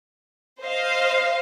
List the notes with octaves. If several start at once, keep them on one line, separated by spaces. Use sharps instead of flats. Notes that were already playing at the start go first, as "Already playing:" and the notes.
C5 D#5 F5